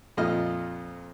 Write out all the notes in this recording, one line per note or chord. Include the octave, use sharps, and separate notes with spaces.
F2 A#2 F4 D#5 F6